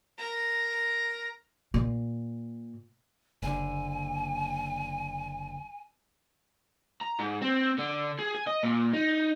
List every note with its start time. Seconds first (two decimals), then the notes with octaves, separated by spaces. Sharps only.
0.18 A#4 A#5
1.74 A#2
3.43 F#1 D3 G#5
7.01 A#5
7.19 G#2
7.42 C4
7.79 D3
8.19 G#4
8.35 G#5
8.47 D#5
8.63 A#2
8.93 D#4